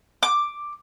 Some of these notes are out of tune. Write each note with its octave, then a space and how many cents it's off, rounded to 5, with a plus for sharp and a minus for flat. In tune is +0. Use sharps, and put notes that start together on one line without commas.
D6 +5